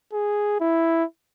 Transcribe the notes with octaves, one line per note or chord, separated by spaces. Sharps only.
G#4
E4